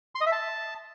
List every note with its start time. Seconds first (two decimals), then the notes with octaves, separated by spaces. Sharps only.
0.15 C6
0.21 D#5
0.26 E5
0.32 A5